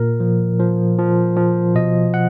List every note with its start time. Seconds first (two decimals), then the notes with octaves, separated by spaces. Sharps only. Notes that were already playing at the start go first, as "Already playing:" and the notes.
Already playing: A#2 A#4
0.20 F3
0.60 F3
0.99 F3
1.37 F3
1.75 B2 D#5
2.14 F#5